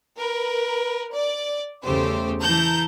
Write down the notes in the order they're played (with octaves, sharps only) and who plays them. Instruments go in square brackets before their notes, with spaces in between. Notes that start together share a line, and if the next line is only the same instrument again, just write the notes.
[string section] A#4 B4
D5
E2 C#3 A3 G4 C5
E3 A5 A#5 G6